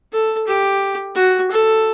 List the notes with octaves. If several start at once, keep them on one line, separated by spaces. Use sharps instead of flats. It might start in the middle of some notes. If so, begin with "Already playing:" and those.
A4
G4
F#4
A4